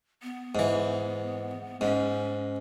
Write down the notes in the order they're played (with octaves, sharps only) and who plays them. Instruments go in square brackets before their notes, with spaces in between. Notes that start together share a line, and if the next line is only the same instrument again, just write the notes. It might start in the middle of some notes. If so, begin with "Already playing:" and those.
[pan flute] B3
[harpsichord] G#2 E3
[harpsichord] G#2 [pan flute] C#4